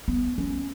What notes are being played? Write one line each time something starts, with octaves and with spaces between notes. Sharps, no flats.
B3
C#4